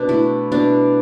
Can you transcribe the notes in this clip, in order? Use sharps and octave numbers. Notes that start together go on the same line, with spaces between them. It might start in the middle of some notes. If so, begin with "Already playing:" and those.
Already playing: B2 D4
A3 E4
B2 D4